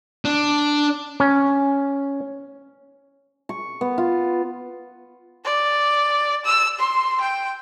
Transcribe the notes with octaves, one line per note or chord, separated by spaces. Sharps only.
D4
C#4
C#6
B3
F4
D5
E6
C6
G5